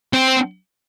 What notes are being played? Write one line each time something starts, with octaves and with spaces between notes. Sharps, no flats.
C4